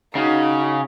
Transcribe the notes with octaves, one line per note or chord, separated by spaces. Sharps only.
C#3 D#4 F#4